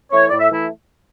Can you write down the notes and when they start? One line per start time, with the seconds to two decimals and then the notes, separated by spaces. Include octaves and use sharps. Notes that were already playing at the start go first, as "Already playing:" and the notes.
0.11 E3 A3 E4 C#5
0.30 A2 D5
0.40 E5
0.49 E3 A3 E4